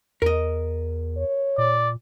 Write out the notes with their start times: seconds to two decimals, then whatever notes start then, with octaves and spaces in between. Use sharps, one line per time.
0.22 E2 A#4 D#5
1.17 C#5
1.58 A#2 D5